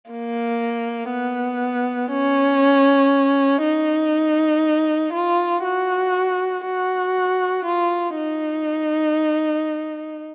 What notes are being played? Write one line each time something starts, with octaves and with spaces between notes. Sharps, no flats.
A#3
B3
C#4
D#4
F4
F#4
F#4
F4
D#4